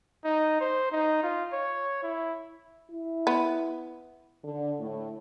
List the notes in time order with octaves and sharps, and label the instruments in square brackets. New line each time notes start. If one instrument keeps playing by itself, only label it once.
[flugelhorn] D#4
C5
D#4
F4
C#5
E4
[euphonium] E4
[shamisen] B3
[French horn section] D3
A2